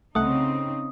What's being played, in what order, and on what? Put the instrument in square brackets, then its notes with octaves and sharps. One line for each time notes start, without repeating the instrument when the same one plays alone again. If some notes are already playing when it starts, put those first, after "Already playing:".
[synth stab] C2 A3 F#5 [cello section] C#3 C4 D#4 [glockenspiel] D#6